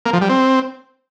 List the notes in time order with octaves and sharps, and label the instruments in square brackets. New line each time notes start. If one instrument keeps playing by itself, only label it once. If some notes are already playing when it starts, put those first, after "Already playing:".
[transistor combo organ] A#3
F3
G3
C4